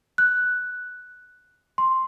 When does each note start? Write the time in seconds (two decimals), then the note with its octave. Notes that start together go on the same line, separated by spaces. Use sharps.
0.18 F#6
1.78 C6